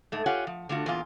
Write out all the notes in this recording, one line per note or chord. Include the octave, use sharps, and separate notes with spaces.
G#2 A3
F4 G4 C#5 F#5 G#5
F3
D3 A3 F4 F#4
E2 A#2 F4